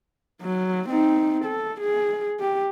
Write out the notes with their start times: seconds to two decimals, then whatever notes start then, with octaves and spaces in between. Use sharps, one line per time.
0.42 F#3
0.90 C4 D#4
1.45 A4
1.81 G#4
2.40 G4